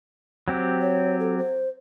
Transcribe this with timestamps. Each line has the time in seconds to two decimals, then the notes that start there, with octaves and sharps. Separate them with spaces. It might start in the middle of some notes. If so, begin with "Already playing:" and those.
0.48 F#3 C4 G4
0.81 C#5
1.20 A4
1.38 C5